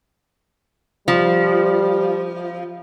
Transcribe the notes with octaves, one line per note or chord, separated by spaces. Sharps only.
F3 G3